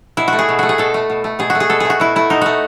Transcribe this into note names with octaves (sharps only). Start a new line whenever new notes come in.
B2 E4
F#4
A3
G#4
B2
A3 F#4
G#4
B2 A4
A3
B2
A3
B2 G#4
F#4
A3
G#4
B2 A4
A3 G#4
F#4
B2 E4
A3 E4
B2 D#4
A3 F#4